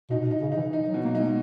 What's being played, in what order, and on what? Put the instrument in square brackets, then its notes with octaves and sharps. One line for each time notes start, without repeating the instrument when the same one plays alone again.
[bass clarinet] B2 [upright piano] D#4
[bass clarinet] B2
[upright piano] D#4
[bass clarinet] C#3
[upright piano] D#4
[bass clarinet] E3
[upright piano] D#4
[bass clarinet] F#3
[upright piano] B2
[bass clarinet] A#3
[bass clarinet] G#3 [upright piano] D#4